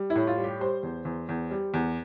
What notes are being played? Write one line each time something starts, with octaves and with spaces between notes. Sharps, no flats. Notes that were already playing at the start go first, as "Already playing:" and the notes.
Already playing: G3
E4
A2
F4
G3
G4
G3 C5
E2
E2
E2
G3
E2